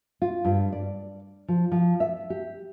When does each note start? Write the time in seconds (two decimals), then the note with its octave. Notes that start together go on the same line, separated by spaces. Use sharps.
0.22 F4
0.45 G2
0.72 D5
1.48 F3
1.72 F3
2.00 E5
2.30 G4